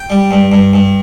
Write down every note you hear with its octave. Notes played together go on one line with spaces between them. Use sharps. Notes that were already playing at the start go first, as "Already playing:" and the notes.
Already playing: G5
G3
G2
G2
G2